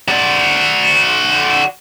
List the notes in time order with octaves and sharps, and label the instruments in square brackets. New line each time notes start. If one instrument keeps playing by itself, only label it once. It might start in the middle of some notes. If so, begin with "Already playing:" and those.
[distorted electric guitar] F#4 D5